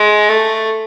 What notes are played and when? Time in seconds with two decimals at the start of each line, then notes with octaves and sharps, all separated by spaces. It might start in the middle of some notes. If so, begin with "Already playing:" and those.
Already playing: G#3
0.29 A3